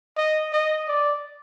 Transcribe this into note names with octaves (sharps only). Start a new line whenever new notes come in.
D#5
D#5
D5